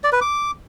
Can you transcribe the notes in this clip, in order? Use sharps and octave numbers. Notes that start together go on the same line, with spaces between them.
D5
B4
D6